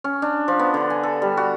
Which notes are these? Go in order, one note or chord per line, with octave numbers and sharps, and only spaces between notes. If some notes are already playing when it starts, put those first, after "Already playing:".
C#4
D4
F3
B3
D3
G#5
A4
G3
F#4